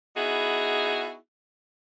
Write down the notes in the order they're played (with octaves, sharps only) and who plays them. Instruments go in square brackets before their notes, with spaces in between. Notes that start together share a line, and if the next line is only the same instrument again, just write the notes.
[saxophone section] B3 D#4 E4 F#4 G#4